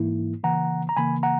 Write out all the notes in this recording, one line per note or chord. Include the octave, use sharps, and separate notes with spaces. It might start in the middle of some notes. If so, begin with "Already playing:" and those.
Already playing: G#2 E3 A#3 E4
C#3 E3 A#3 F#5 A#5
A#5
C#3 E3 A#3 G#5 B5
F#5 A#5